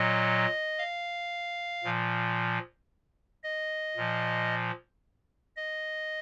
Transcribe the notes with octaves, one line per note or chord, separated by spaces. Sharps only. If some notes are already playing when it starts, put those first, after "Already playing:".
Already playing: A#2 F#3 D#5
F5
A#2 F3
D#5
A#2 F3
D#5